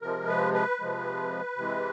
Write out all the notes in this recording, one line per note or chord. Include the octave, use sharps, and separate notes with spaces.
C3 F3 G#3 A#4
B4
B4
C3 F3 G#3
C3 E3 G#3